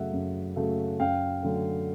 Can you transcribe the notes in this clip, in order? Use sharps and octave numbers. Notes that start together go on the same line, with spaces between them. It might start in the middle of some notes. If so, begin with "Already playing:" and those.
Already playing: F#2 C#3 F#3 A3 E5 F#5
F#2
C#3 F#3 A3
F#2 F5 G5
D3 F#3 A3